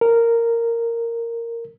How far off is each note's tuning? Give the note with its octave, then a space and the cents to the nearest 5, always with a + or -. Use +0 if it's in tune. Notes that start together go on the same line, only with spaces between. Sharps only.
A#4 -10